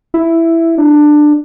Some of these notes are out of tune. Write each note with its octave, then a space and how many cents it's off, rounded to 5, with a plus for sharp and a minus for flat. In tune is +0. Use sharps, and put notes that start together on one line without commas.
E4 +5
D4 +15